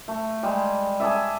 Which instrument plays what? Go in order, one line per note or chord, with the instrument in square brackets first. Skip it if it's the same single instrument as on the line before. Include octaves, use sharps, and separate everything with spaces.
[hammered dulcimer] A3
G3 G#3
G#4 A4 D5 E5